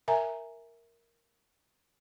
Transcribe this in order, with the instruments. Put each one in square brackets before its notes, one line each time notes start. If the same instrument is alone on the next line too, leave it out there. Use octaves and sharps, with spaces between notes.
[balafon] A#4 E5 G#5 A#5